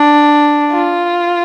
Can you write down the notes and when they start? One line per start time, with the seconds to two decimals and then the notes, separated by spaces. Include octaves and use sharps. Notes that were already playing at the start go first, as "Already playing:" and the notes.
Already playing: D4
0.72 F4